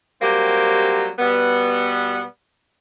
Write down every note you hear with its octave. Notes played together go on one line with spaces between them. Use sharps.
F#3 G3 A#3 C4 G4
B2 G3 B3